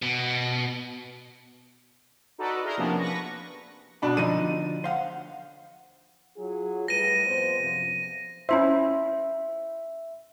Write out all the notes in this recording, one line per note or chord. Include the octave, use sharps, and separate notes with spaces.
B2
D#4 F#4 A4 B4 D5
E4 G#4 A#4 A#5 C6
C3 F3 A#3 B3 C#4 D4
B4 C#6 A#6
B2 D4 B5
D3 F3 D#4 D#7
C5 F5 F#5
F#3 F4 G#4
A2 G3 B4 A#6 D#7
F2 B3 C5
F#2 C3 F3
C#4 E4 C5 E5